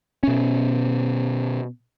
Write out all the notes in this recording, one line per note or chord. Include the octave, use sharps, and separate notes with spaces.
B2 C#4